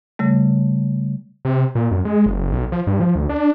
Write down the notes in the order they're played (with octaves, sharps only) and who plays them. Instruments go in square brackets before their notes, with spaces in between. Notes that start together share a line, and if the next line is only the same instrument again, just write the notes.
[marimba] C#3 G3 A3
[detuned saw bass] C3
A#2
F#2
G#3
F#1
B1
F3
G2
F3
D2
D4